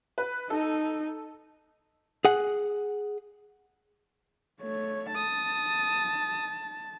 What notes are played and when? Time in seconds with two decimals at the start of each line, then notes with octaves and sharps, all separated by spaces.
0.18 B4
0.50 D#4 A4
2.25 G#4 F#5
4.62 A3 C#5
5.15 A5 D#6